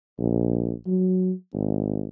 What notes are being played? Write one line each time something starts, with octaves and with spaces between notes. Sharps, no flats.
A#1
F#3
G#1